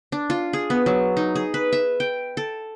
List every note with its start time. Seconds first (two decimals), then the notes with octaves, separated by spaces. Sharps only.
0.12 D4
0.30 F4
0.53 G#4
0.70 B3
0.86 F#3
1.17 D#4
1.35 G#4
1.54 B4
1.72 E5
2.00 G5
2.37 A4